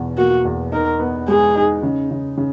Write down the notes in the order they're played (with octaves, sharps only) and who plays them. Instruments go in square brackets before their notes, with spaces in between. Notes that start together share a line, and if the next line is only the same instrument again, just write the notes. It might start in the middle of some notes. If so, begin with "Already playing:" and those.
Already playing: [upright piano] E2 B2
[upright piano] A#3 [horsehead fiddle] F#4
[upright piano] E2
[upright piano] D#4 [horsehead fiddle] A#4
[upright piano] B3
[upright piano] G#3 [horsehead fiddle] G#4
[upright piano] D#4
C#3
C#3
C#3